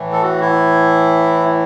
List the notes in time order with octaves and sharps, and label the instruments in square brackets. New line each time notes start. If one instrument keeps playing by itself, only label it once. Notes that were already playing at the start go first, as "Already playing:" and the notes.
Already playing: [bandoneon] A2 E3
A4
F#4
E4